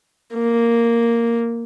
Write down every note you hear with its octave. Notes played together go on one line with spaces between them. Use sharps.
A#3